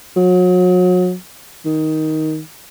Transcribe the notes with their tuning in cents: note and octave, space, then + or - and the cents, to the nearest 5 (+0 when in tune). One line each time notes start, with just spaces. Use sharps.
F#3 -35
D#3 +10